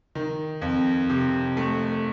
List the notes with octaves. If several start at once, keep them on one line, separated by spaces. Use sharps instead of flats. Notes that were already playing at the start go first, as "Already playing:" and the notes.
D#3
F2
C3
A3